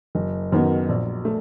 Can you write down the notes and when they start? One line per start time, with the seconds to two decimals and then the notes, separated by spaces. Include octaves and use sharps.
0.15 F#1
0.52 F#2 D#3 F#3 B3
0.89 A#1
1.25 A3